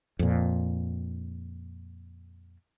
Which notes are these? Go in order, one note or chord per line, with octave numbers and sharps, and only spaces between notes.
F2 A#2